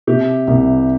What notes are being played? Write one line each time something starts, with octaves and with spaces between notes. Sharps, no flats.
C3 G4
C2